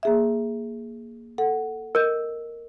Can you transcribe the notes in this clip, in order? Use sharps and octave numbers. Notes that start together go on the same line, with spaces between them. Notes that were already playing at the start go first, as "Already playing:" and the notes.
A#3 G#4 E5
A4 F#5
A#4 D#5 G6